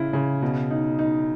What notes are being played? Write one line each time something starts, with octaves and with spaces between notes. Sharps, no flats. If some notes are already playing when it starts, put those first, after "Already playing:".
Already playing: C#3 E4
C#3
B2
D#4
D#4